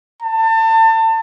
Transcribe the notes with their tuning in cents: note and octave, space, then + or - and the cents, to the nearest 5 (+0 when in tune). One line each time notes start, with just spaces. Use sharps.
A5 +30